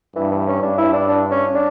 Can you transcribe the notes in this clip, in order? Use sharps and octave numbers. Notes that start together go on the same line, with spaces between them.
G2 E3
E3
C#4
G2 D4
E4
D4
D4
C#4
D4